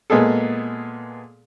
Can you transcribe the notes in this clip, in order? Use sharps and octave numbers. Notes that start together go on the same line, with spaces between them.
A#2 G#3 B3 G#4 A4